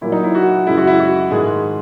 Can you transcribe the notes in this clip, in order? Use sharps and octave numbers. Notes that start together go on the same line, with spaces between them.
A#2 F#3 A#3 E4
D#4
E4
F#4
F#2 C#3 G#3 E4
F#4
E4
F#4
G#2 D#3 G#3 G#4